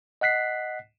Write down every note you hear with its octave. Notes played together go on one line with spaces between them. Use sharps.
D#5 F#5 F#6 B6 C7